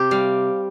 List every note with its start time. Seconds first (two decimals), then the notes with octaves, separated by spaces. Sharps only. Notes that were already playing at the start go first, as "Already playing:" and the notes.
Already playing: C3 G4 C5
0.11 G3 F5